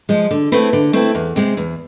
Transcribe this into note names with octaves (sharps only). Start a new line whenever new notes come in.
F3 G#3
D3
A3 C4 E4 B4
D3
A3 C4 E4 B4
E2
C3 G#3 C4
E2